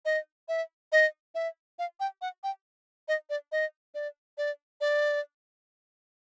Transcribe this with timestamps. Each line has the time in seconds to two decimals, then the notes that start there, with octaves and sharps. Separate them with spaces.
0.05 D#5
0.48 E5
0.92 D#5
1.35 E5
1.79 F5
2.00 G5
2.22 F#5
2.44 G5
3.08 D#5
3.30 D5
3.52 D#5
3.94 D5
4.38 D5
4.81 D5